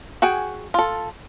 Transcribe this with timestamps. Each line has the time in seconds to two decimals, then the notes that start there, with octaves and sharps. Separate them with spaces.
0.22 F#4 G#4 G5 G#5
0.74 F4 A4